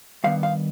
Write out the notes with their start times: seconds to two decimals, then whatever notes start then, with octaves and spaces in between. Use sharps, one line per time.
0.24 G2 D#3 B3 F5
0.43 F5